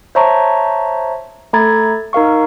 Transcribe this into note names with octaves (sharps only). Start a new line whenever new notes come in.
C5 C#5 E5 A5 A#5 C#6
A3 A4 A#5 B5 G#6 A6
D#4 A#4 F5 C#6